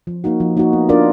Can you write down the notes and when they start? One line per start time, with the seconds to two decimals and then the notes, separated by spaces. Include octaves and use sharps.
0.07 F3
0.24 A#3 D#4 F#4
0.40 F3
0.57 A#3 D#4 F#4
0.73 B3
0.89 D4 F4 A#4 D5